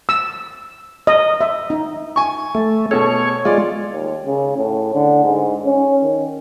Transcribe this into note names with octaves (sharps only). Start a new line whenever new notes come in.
E6
D#5
E5
D#4
G#5 C#6
A3
B2 G#4 A4 C#5
G#3 F4 D5
D#2
C#3
A2
D3
G#2
C#4
D#3